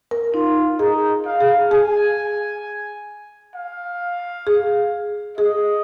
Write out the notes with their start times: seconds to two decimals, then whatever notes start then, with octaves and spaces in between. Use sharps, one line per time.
0.11 A#4
0.33 D#4 F4
0.79 D#4 G#4
1.26 F5
1.40 G#4
1.71 G#4 G#5
3.55 F5
4.47 G#4
5.37 G#4 D#5